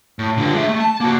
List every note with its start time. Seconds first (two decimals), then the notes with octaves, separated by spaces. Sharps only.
0.19 A2
0.37 D3 F4
0.54 G#3 E5
0.69 A3
0.80 A5
1.00 A#3 F#4